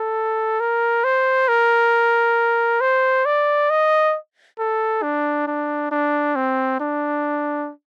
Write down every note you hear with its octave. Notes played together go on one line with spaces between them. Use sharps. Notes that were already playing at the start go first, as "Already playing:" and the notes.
Already playing: A4
A#4
C5
A#4
C5
D5
D#5
A4
D4
D4
D4
C4
D4